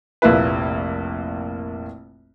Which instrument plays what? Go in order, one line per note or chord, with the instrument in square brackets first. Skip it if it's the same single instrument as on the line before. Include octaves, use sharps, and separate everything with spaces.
[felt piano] F1 A#1 A#3 E4 B4